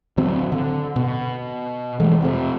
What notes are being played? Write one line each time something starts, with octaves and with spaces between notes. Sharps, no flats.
D1 D3 F#3 C4
D3
B2
E3 G#3 A3
F1 F2 C3